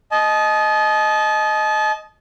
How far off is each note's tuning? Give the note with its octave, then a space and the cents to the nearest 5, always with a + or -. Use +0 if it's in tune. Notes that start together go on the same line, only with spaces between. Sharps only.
D#5 +0 A5 -35